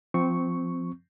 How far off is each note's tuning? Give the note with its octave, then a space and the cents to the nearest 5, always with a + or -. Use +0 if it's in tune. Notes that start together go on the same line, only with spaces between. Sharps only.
F3 +0 C4 -10 C#6 +0